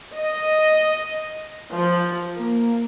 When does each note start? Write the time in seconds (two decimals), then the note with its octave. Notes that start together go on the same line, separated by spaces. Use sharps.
0.14 D#5
1.75 F3
2.38 A#3